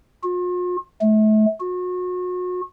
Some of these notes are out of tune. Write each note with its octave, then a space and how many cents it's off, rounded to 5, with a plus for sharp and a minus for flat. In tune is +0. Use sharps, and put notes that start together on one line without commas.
F4 +45
A3 -35
F#4 -35